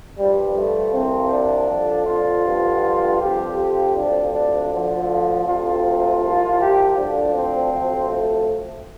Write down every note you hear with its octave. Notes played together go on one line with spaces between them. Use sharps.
G2 F3 G3
A3
C2 C3 F3 C4
D4
F2 D3 F3
F4
G2 D3 F3
F2 F3 G4
G4
D2 C3 F3 D4
D4
D2 D3 F3
F4
D2 C3 F3 F4
C2 C3 F3
G4
D2 D3 F3 D4
C4
D2 C3 F3
A3